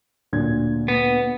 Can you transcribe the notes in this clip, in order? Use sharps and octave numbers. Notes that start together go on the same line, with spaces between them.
D2 A#2 G#6
B3